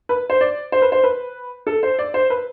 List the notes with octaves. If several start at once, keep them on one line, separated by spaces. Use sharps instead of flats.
B4
C5
D5
C5
B4
C5
B4
A4
C5
D5
C5
B4